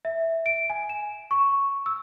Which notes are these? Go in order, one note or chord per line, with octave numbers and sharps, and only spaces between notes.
E5
D7
G#5
E7
C#6
E6